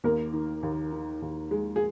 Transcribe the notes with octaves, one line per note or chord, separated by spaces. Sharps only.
D#2 A#3 A#4
D#3
D#2
D#3
D#2
G#3
G#4